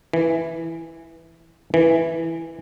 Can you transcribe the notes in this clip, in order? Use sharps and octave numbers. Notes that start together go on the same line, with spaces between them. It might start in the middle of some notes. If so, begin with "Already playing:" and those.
E3
E3